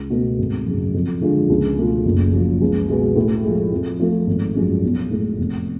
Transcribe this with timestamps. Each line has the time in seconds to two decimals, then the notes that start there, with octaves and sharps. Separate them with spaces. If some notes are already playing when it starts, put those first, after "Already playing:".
Already playing: C#2
0.10 B2 A3
0.39 G#1
0.66 F#2 C#3
0.94 F2
1.21 D3 F3 G#3 D4
1.49 C#2
1.77 B2 A3 F4
2.05 F#1
2.33 F#2 F3
2.61 C#2
2.88 B2 G#3 B3 F#4
3.16 A2
3.44 F3 G#3
3.72 F2
4.00 F3 A3 F4
4.27 G#1
4.55 F#2 F3 G#3 C#4
4.83 B1
5.10 A2 G#3
5.38 F1